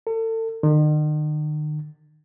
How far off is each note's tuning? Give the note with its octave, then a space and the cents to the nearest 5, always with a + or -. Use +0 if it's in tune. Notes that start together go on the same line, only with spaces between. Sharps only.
A4 +35
D#3 -45